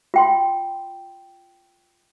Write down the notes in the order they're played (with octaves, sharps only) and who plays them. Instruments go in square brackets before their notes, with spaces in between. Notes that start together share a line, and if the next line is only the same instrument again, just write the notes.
[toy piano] F4 G5 C6